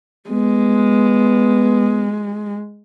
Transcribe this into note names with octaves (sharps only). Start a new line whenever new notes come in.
G#3 B3